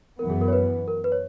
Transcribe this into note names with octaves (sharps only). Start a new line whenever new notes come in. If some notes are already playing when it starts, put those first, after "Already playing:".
F#2 E3 B3 A#4
G#4
A#4
C#5
B4
A#4
B4
C#5